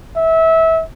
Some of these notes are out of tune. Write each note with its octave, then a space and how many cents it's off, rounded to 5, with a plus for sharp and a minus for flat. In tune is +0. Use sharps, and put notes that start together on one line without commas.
E5 -25